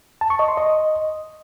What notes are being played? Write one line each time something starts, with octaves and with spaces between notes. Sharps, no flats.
A5
C#6
D#5
C6
D#5